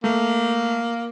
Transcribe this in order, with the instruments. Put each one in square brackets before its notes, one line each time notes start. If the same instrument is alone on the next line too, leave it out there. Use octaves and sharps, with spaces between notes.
[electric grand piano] A3 [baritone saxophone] A#3